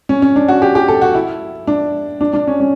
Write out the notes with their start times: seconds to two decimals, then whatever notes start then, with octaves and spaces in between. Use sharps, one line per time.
0.09 C#4
0.22 C#4
0.36 D4
0.48 F#4
0.62 G4
0.75 G4
0.88 A4
1.01 F#4
1.15 E4
1.67 D4
2.21 D4
2.33 D4
2.47 C#4
2.60 C#4